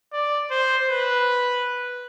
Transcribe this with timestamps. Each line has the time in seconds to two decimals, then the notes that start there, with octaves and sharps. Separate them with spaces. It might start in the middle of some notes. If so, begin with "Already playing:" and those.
0.13 D5
0.51 C5
0.90 B4